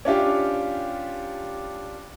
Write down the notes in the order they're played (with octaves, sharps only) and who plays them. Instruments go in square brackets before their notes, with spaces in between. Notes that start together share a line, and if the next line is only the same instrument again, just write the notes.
[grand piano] C#4 D4 F4 G4